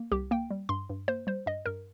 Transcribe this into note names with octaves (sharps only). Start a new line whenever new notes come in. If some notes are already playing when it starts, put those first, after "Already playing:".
Already playing: A#3
C2 G4
A#3 G5
G3
G2 C6
G2
A#3 C5
G3 C5
G2 D#5
G2 A#4